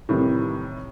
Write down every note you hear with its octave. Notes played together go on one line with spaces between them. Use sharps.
A2 C3 D#3 E3 G3